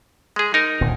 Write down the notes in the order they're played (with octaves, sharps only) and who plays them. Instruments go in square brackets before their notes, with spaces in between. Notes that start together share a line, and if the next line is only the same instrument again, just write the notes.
[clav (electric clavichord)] G#3 G#4
D#4 A#4
[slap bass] D#1 D2 A#2